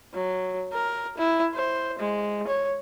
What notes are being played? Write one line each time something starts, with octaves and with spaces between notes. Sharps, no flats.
F#3
A#4
E4
C5
G#3
C#5